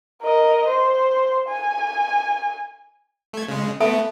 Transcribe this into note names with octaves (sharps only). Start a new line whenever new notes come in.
A#4 D#5
C5
G#5
A3 G#6
C#3 G#3
A3 B3 A4 E5 A5